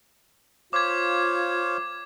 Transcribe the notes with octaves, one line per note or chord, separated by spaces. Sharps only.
F4 C5 C#5 F5 D6 G#6